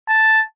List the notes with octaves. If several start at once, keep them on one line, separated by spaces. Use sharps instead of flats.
A5